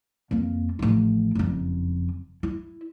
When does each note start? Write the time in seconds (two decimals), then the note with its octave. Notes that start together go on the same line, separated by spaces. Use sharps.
0.31 F2 A#3
0.79 A1 F3
1.35 F#1 F2
2.43 E4